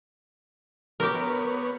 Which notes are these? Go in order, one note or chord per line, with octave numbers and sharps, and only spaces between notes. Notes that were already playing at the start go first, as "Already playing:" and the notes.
B3 G4 A#4 C#5